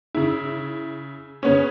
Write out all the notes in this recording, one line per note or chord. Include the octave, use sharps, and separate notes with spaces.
C#3 E4
C#3 B3 C#4 C#5